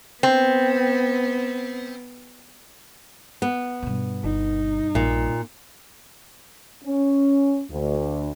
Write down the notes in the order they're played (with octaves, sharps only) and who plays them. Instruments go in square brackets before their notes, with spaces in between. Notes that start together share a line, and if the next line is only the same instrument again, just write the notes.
[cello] B3 [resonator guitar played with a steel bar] C4
[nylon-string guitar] B3
[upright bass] G2 B2
[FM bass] G1 [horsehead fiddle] D#4
[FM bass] A#1 [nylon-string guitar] A#2
[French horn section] C#4
D2